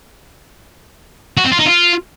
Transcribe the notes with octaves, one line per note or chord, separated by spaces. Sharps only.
F#4
C4
F4
D#4
F4